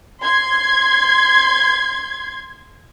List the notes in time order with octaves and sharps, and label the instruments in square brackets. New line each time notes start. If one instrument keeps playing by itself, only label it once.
[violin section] C6 G#6